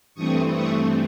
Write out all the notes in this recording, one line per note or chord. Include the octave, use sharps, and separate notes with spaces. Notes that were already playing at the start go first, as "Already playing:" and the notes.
G2 E3 A3 C4 C#6 D#6
C#6 D#6